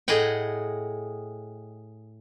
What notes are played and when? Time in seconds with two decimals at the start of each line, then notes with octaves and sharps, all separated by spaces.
0.08 A2 G#4 D#5 F#5 G5